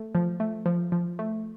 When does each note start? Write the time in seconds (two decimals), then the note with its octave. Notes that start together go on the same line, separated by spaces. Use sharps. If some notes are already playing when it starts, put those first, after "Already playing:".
Already playing: A3
0.15 F3
0.40 A3
0.66 F3
0.92 F3
1.19 A3